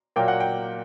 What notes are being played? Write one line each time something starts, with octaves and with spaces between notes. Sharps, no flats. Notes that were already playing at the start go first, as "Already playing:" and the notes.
A#2 F#3 A#3 G5
F#5
G5